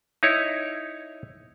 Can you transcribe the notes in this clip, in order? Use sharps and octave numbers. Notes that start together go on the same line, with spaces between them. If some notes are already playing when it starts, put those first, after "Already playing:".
D#4 E4 C#5